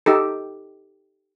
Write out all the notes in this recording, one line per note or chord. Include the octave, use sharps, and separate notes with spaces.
D#4 G4 A4